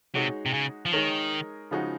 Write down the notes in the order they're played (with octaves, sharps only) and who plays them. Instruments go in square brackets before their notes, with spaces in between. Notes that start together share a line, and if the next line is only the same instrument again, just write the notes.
[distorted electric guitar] C3 [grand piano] G#3 D#4 F#4 C#5
[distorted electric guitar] C3
C#3
F3
[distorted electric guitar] D#3 [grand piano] G#3 D#4 A#4 C#5
[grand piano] C#3 F3 G#3 D#4 F#4